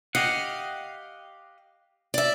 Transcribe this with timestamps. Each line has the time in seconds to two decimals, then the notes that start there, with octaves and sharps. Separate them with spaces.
0.15 G4 D#5 F5 F#5
2.14 D5 E5